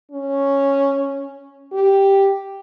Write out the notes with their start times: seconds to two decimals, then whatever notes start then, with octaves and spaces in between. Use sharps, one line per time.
0.11 C#4
1.73 G4